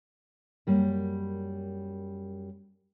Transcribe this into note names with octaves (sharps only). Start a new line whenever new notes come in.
F#2 G3 A#3